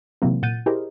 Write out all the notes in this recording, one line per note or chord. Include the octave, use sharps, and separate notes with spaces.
C3 D#3 E3 F#3 A#3 C4
A#2 F#5 G6 A6 D#7
E4 G4 G#4 A#4 C5 D#5